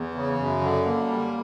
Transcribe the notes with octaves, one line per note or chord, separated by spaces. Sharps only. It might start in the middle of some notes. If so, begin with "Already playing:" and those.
Already playing: E2
C#3
F#2
D3
A#3
G3